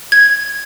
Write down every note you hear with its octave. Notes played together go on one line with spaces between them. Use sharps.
G#6